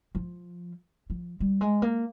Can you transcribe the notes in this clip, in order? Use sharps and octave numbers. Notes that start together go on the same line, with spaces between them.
F3
F3
G3
G#3
A#3